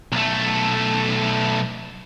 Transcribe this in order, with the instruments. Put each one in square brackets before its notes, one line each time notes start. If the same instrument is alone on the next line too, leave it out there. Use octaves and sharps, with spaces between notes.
[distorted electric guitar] B1 A3